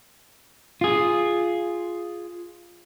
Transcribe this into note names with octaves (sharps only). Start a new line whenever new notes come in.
F4 G#4